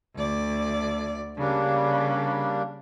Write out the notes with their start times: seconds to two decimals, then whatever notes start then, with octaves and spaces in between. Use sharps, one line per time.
0.15 D2 D5
1.37 C#3 G3 A#3 D4